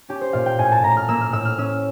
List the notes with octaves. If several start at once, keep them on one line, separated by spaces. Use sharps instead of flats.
C#4 G4
C5
A#2 F5
G5
A2 G#5
A5
A2 A#5
F6
A#3 E6
F6
A2 E6
F6
C#4 E6